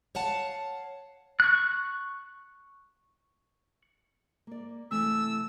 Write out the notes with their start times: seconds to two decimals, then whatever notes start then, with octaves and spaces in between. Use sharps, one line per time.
0.15 C#5 F5 F#5 A5
1.40 C#6 F#6
4.47 A#3 D5
4.90 C3 E3 A3 E6